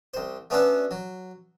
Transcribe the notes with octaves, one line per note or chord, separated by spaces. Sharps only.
C2 C5
A3 B3 C#4 D4 F#4 A4
F#3